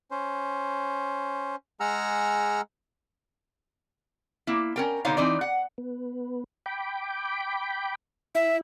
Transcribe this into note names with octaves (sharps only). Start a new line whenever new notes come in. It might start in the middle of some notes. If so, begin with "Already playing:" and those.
C#4 C5
G#3 G#4 F#5 A#5 E6 F6
A#3 E4
C#4 A#4 G5
B2 D3 D#4 C5 C#5 F5
E3 C4 D#4 D5
F#5
B3
G5 B5 D6
E4 E5